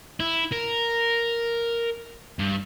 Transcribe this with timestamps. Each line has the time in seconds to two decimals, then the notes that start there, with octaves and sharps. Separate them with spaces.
0.20 E4
0.52 A#4
2.39 G2